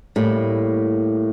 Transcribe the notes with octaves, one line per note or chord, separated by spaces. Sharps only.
A2 G3 A#3